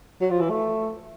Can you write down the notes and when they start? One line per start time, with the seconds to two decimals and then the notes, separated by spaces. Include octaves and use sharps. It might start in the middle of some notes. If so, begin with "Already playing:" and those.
0.21 F#3
0.31 F3
0.40 E3
0.50 A3